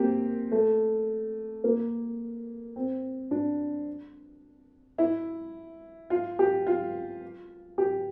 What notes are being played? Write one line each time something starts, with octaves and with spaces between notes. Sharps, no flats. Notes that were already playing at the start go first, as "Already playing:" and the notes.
Already playing: A#3 C4 G4
A3
A#3
C4
D4
E4
F4
G4
F4
G4